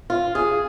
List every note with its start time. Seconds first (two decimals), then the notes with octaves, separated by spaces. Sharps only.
0.10 F4
0.35 G#4